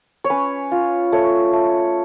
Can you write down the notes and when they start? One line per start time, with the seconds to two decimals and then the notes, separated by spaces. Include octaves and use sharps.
0.24 C#5
0.30 C#4 B4
0.72 F4
1.12 A3 C#5
1.53 A3